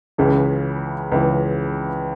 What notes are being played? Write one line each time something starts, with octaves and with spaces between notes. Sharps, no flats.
C#2 C#3 E3
C#2 C#3 E3